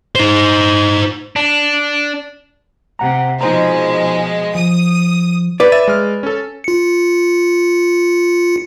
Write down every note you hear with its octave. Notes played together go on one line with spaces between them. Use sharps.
D#4 C5
D4
C3 F#5 A#5
B2 F3 G#3 D#4 C5 A#5
F3 D#6
B4 D5
E5 A6 D#7
G#3 F6
C#4 A4
F4 C#7